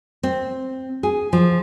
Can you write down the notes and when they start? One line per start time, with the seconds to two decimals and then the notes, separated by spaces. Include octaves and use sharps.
0.23 C4
1.03 G#4
1.33 F3